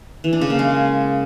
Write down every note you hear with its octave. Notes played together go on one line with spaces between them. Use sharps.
E3
D4
C#3
A#3
G#3